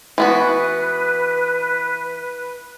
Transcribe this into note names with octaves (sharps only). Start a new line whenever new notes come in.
E3 B3 F#4 B4